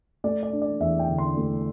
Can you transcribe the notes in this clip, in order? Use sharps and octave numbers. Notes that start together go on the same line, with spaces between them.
A3 D5
D5
D4
D5
E2 E5
G5
D3
C6
A3